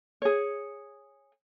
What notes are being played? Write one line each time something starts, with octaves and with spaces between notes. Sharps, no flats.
G#4 C#5